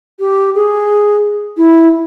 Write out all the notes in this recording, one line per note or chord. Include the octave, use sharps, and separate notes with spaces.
G4
G#4
E4